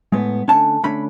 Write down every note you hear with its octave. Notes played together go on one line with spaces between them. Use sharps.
A2 G#3 B3
D3 A3 C#4 A5
D3 A3 C#4 B5